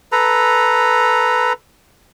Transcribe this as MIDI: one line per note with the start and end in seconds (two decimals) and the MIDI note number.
0.12 1.53 69
0.12 1.53 71
0.12 1.53 82